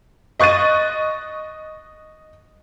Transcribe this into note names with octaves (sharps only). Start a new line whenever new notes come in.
D#5 C#6 F#6 A6 D#7